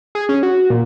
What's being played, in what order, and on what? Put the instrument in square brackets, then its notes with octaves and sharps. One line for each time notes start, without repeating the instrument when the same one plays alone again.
[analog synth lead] G#4
C#4
F#4
A#2